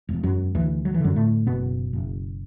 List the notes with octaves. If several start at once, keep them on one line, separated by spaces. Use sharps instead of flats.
E1
F#2 F#3
D2 E3
F#3
E3
F#2 D3 F#3
A2 A3
F#1 B2 B3
F#1